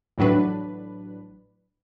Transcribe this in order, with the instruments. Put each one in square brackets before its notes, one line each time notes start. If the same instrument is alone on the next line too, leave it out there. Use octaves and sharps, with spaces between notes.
[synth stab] A1 A2 F#3 D4 B4